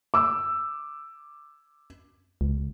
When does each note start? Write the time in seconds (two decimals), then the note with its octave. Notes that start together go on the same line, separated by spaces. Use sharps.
0.14 D6 E6
2.41 C#2